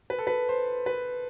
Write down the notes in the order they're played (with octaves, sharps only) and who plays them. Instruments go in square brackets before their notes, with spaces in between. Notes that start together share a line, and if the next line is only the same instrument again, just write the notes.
[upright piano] B4
A4
B4
C5
B4